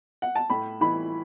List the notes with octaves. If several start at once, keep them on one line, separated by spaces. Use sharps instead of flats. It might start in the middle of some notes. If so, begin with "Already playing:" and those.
F#5
A5
A2 B5
E3 B5